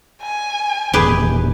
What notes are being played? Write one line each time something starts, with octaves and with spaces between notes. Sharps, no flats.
G#5
E1 A#2 G4 G#4 B4